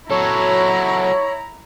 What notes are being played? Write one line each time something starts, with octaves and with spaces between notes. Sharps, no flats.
F#3 E4 A4 C#5 A#5